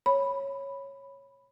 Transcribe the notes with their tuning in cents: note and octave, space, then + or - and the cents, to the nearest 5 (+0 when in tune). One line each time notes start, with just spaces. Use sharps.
C#5 -10 B5 +0